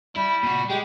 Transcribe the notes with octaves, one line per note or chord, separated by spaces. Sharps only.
G3 E4
A#2 F#4
G#3 G4